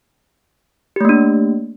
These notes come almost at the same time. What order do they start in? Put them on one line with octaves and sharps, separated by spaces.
G4 A3 A#3 D4